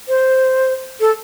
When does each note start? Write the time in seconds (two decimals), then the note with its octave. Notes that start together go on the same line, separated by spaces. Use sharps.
0.08 C5
1.00 A4